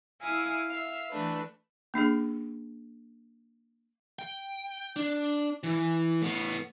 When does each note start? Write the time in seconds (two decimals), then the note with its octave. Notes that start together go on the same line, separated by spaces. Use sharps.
0.21 E4 E5 F5 G#5 D#6
0.69 E5 F5
1.10 E3 A3 D4 B4
1.94 A#3 C#4 D4 G#4
4.19 G5
4.96 D4
5.63 E3
6.22 A2 B3